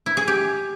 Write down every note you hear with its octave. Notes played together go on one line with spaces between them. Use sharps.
E4
G#4
G4